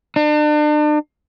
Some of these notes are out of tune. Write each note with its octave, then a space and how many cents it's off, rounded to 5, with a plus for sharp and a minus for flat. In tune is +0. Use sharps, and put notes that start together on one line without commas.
D4 +40